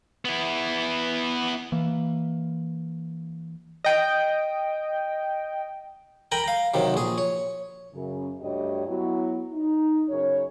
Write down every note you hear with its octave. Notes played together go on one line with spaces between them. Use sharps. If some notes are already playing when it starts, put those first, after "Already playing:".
B3 E4
E3 A#3
D#5 G5
A#4 G5 G#5 A#5 B5
F5 A#5
F#2 C3 D#3
A#1 G#4
C#5
F#2 C#3
D2 G2 G4 C#5 D#5
F#3 B3 E4 F#4
D#4
F#2 C#3 C#5